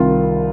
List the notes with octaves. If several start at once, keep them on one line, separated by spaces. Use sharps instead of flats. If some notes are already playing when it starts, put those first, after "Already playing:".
Already playing: C2 C3 D#3 F4